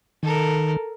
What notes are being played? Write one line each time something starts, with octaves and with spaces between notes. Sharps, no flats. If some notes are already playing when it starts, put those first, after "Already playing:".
D#3 A4 A#4